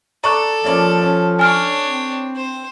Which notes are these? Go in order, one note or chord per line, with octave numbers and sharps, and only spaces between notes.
A4 D5 A#5 C#6 F#6
F3 A#3 C#4 D5
C#4
D4 C#5 G#5 F6 D7
C4
C5